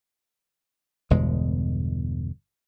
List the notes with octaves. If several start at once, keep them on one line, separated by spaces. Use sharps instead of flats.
G1 E2 B2 G#3